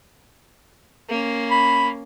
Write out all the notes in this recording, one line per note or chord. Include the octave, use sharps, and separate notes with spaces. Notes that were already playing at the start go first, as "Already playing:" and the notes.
A#3 C#4
B5